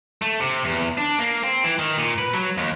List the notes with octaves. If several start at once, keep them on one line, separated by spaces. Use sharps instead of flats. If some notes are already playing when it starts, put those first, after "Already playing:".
A3
C3
E2
D4
A#3
C4
E3
D#3
A#2
B4
F#3
D#2